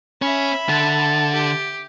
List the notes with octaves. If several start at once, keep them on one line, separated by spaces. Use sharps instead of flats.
C#4 E5 B5
D3 A5
G4